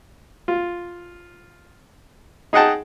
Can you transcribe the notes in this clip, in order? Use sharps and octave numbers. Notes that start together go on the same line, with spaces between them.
F4
D#4 G#4 D#5 F#5 G5 A5